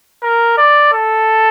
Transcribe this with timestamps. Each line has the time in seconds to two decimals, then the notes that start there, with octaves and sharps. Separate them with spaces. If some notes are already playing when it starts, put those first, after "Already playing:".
0.22 A#4
0.58 D5
0.93 A4